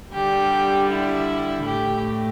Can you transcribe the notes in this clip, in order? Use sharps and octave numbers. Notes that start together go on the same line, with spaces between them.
D3 G3 G4
E4
A2 A3 G4